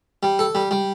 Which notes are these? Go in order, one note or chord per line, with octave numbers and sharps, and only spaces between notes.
G3
A4
G3
G3